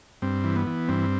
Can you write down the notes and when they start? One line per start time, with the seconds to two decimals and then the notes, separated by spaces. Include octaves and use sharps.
0.22 G2 C4
0.44 E3
0.56 B3
0.67 E3
0.88 G2 C4